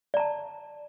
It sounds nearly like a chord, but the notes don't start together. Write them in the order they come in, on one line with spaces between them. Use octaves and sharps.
D5 A#5 A5